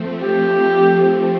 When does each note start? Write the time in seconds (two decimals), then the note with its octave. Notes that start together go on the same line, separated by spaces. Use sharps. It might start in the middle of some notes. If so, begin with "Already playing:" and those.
Already playing: F3 A3 C4
0.22 G4